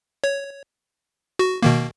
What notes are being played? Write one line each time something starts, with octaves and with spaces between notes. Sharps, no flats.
C#5
F#4
B2 D#3 A#3